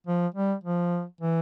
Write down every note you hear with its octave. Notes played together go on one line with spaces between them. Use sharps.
F3
G3
F3
E3